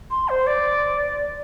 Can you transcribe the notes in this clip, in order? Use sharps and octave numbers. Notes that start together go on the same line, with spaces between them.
C6
C5
D5